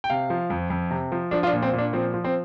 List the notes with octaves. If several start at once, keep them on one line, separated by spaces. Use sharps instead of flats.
G5
C3 F5
F3
F2
F2
C3
F3
F3 D4
F4
D4
A#2
C4
A#2
D4
F3 C4
F3
C4